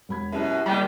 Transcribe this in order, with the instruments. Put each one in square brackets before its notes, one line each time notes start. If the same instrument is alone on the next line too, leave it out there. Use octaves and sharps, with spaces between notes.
[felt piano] E1 B5 G#6
[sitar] F#2 B2 [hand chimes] E4 G4 A#4 [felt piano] G#4 E5
[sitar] D#3 G#3 [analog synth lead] G3 [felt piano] A#3 G#5 B6